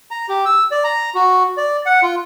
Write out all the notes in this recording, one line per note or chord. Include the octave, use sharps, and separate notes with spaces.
A#5
G4
E6
D5
A#5
F#4
D5
F#5
F4